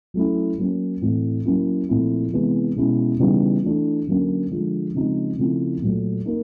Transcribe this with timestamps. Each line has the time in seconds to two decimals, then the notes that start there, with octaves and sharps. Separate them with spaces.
0.14 F#3 A3 C#4 E4
0.58 F#3 A#3 C#4
1.01 A2 E3 A3 C4
1.45 F#3 A#3 C#4 E4
1.89 A#2 F3 A3 C4 E4
2.33 C3 E3 G#3 B3
2.76 B2 G#3 C#4 E4
3.19 C#3 E3 G3 B3 D#4
3.64 E3 A3 D4
4.07 D3 F#3 A#3 C#4
4.51 D3 F3 G#3
4.95 C#3 F3 G#3 C4 D#4
5.38 C#3 F3 A3 C4 E4
5.82 A#2 F#3 A3
6.26 A#3 D#4